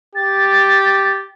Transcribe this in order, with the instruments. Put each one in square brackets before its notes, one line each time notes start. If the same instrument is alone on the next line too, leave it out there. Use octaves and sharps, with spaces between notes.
[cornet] G4 [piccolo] A6